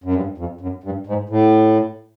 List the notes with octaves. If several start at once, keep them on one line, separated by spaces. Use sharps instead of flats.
F#2
G2
F2
F#2
G2
G#2
A2